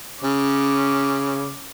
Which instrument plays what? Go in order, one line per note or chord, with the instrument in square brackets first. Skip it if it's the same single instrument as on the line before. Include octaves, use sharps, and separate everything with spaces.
[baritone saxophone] C#3 [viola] C#4 D6